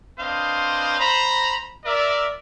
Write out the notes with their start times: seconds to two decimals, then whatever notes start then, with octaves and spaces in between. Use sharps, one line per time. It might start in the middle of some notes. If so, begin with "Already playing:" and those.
0.19 C4 D4 B4 C5 D#5 F5
1.00 C5 A#5 B5
1.85 A#4 D5 E5